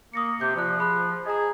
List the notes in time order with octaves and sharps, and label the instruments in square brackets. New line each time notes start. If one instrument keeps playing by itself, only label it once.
[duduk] A#3 [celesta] D#6 A#6 C#7
[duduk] C3 [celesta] D6 G6
[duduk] F3 [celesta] F4 D5 F#6
[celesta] G#4 B5 F#6
[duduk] G#4 [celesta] D#5 A#5